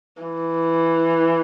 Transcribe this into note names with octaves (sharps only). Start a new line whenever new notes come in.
E3